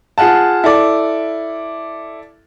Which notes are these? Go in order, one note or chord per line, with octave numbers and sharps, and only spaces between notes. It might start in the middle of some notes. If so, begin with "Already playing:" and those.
F4 G#4 F5 F#5 A5
E4 A4 D5 D6